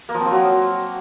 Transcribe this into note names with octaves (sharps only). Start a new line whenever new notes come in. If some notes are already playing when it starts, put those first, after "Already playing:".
A#3
F3
C4
F3
F#3